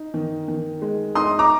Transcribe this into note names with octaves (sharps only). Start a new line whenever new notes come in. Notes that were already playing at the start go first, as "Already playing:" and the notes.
Already playing: D#4
D#3
D#3
G#3
D#4 C6 D#6
A#5 D6